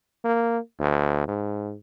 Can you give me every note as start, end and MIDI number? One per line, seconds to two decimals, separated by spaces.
0.25 0.58 58
0.80 1.26 38
1.28 1.75 44